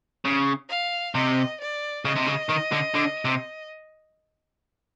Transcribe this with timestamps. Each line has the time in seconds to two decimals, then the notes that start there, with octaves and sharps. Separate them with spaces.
0.25 C#3
0.69 F5
1.14 C3 D#5
1.60 D5
2.05 C#3 D#5
2.16 C3
2.27 C#3
2.49 D#3
2.73 D3
2.95 D3
3.25 C3